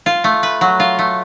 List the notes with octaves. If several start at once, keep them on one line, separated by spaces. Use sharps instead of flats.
F4
A3
B4
F#3
F4
A3